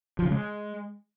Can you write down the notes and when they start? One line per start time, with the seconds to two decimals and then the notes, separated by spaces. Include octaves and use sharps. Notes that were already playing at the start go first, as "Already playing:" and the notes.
0.19 F3
0.25 C#3
0.31 G#3